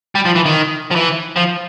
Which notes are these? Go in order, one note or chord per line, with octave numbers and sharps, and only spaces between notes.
G3
F3
E3
D#3
F3
E3
F3